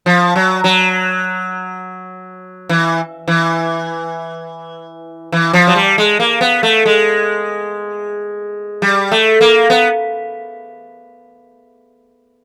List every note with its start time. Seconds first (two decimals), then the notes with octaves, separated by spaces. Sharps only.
0.06 F3
0.36 F#3
0.64 F#3
2.69 E3
3.28 E3
5.32 E3
5.53 F3
5.67 F#3
5.76 G3
5.98 G#3
6.20 A#3
6.41 B3
6.63 A3
6.86 G#3
8.82 G3
9.12 A3
9.41 A#3
9.70 B3